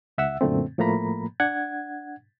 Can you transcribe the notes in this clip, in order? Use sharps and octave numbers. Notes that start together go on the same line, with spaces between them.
C#2 E5 F#5 E6
F#2 A#2 D3 A3 C4
A2 F3 A3 A#3 A#5 B5
D4 F#5 G#6